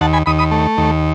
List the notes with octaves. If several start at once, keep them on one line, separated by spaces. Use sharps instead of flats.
D#2 F#5 A5
G#5 B5
D#2 B5 D#6
B5 D#6
A3
D#2